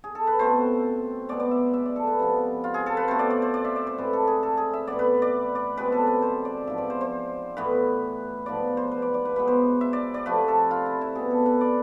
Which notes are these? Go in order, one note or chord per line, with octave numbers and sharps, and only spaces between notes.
G#4
A4
B4
B2 A3 C4 C5
B2 G#3 B3 D5
D5
E5
E5
D5
A4
B4
C3 F3 B3
F4
G#4
A4
B4
B2 A3 C4 C5
D5
D5
C5
D5
E5
D5
C5
A2 G#3 C4 B4
A4
G#4
A4
G#4
E5
A2 E3 B3 D5
B4
D5
D5
B2 G#3 C4 B4
A4
B4
C5
D5
G#2 F3 B3 E5
D5
C5
C5
A2 E3 B3 B4
G#2 F3 B3 D5
C5
B4
D5
D5
B4
B2 G#3 B3 B4
C5
E5
D5
D5
C3 F3 A3 B4
A4
F4
E4
E4
B2 B3 G#4
A4
B4
D5